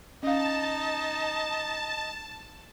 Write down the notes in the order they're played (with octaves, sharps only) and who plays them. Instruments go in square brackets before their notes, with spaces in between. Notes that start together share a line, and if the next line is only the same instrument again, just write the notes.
[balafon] C#4 F5 [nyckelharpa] D#4 [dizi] D#5 [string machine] A5